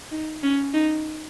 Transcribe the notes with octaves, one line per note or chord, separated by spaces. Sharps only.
D#4
C#4
D#4